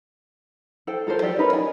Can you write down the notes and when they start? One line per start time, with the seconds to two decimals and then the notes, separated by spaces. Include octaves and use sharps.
0.87 A4 C5 G5
1.07 F4 A4 A#4 C5
1.22 G4 A4 D5 G5
1.39 C#4 D#4 A#4 B4
1.53 G#5